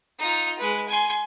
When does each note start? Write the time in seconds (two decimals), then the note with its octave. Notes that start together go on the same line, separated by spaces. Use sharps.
0.19 D#4 F4
0.58 G#3 B4
0.88 G#5 C6